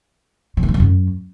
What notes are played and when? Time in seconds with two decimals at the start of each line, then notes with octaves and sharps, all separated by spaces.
0.57 F3
0.63 A3
0.68 F3
0.74 F#3
0.80 F#2